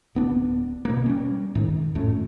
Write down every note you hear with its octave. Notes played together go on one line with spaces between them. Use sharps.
D1 B3 D4
B2 A#3
G3 C#4
G#2 D#3
F2 A2 A3 C#4